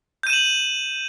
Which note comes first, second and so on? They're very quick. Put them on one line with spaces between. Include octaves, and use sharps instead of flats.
G6 D#7 E7 F#7